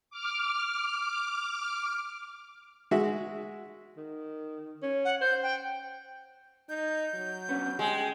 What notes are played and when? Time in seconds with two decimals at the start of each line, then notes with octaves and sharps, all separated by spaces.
0.10 D6 F6
2.91 G#3 F#4 E5
3.97 D#3
4.82 C#4
5.05 F#5
5.21 C5 G6
5.43 G5
6.69 D#4 G6
7.14 F#3
7.49 B3 C#4 D4
7.79 G3 G#3 G4